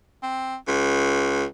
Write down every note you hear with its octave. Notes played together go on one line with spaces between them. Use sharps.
C4
C#2